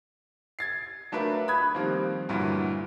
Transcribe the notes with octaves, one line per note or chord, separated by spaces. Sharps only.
G#6 A6 C7
F#3 A3 D4 F4 A#4 B4
B5 D#6 F#6 G#6
D#3 F3 G3 A#3 C4 F4
D2 G2 A#2 D3 E3 F#3